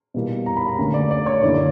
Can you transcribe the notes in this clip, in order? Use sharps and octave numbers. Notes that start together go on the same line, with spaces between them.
B2 G3 A#3 E4
A#5
B5
A#5
D2 D3 A#3 C#4
D5
D5
C#5
F#2 D3 A#3 E4 D5